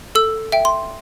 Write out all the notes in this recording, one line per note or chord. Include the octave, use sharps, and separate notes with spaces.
A4 E6
E5 G5
C6